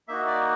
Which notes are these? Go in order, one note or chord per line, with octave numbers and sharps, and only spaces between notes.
A#3 D#4 F#4 E5
D5